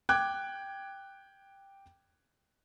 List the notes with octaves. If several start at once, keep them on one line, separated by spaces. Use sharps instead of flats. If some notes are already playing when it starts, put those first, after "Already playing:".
G5 D6 F#6 G#6